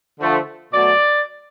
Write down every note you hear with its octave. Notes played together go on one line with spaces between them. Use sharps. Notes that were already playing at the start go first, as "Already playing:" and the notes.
D3 F3 A3
B2 F#3 A3 D5